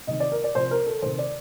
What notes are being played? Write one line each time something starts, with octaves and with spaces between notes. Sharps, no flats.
C3 D#3 D#5
D5
A#4
D5
C3 F3 C5
A#4
A4
C3 D#3 C5
D5